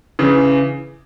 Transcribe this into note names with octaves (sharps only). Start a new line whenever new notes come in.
C#3 E3